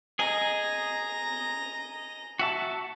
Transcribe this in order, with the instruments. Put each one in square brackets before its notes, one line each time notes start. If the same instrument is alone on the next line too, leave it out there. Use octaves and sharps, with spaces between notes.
[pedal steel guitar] G#4 D#5 [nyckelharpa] A#5
[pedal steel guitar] F#4 E5 A5